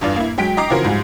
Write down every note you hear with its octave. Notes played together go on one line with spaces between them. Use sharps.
G1 E2 G2 F4 D5
A#3 E4
F#3 G#3 G5 B6 D7
D#5 G5 A#5 D6 C7
C#3 E3 F3 C4 F#4 A#4
G#2 F3 G3 G#3